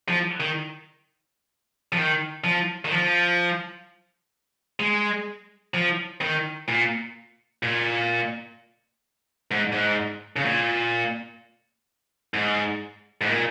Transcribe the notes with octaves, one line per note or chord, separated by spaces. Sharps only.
F3
D#3
F3
D#3
F3
D#3
F3
G#3
F3
D#3
A#2
A#2
G#2
G#2
C#3
A#2
G#2
G#2
A#2